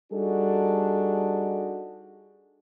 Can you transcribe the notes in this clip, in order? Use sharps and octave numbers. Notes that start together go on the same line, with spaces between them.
G3 D4 D#4 F#4 G#4 A4